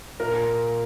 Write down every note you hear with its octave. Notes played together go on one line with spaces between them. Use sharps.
A#2 A#4